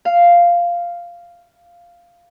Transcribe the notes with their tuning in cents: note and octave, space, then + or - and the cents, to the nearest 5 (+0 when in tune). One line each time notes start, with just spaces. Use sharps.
F5 -5